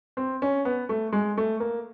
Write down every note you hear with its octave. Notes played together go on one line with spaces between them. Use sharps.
C4
C#4
B3
A3
G#3
A3
A#3